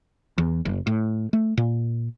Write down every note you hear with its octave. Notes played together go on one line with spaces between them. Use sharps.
E2
F#1
A2
A3
A#2